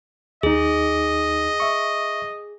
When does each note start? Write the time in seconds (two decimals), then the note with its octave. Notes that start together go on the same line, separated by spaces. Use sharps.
0.43 D#2 D#4 G#4 D#5
1.60 E5 C#6